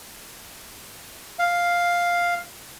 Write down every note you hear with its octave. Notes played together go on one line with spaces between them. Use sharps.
F5